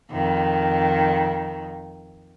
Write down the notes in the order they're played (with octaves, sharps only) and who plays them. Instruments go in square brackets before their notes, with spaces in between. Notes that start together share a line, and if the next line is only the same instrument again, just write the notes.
[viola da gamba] F2 D#3